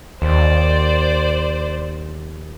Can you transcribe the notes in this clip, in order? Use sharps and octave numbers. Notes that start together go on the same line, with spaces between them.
D#2 C5 D5